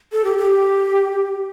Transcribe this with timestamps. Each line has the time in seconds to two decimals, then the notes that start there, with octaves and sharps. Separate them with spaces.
0.12 A4
0.24 G4
0.38 G4